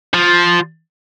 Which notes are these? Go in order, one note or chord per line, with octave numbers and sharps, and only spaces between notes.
F3